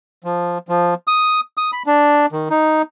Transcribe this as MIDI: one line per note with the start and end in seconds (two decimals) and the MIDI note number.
0.24 0.58 53
0.68 0.94 53
1.07 1.40 87
1.57 1.71 87
1.73 1.83 83
1.86 2.26 62
2.32 2.48 51
2.50 2.82 63